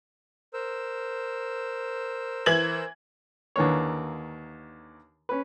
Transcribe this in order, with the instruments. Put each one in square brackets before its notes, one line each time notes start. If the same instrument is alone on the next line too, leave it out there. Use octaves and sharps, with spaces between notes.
[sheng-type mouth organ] A#4 C5 E6
[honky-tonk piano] E3 G#6 F#7
[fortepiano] D#2 D3 E3 A#3 C#5
C#4 B4